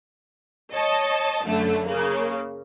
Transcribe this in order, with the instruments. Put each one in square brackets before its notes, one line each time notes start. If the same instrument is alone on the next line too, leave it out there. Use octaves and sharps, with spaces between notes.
[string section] C#5 D#5 A5
F#2 D3 A3
C#3 A#3